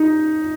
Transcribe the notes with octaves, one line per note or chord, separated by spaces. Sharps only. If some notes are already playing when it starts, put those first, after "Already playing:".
Already playing: D#4